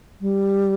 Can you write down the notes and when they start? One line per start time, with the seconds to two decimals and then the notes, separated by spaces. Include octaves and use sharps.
0.21 G3